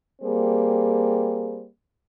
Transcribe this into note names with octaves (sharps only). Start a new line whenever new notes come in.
G3 A#3 C4 G#4